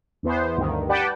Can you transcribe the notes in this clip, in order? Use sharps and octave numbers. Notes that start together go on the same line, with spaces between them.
E2 E3 B3 C5
D2 G2 D#3
G4 B4 D5 F#5 G5 A5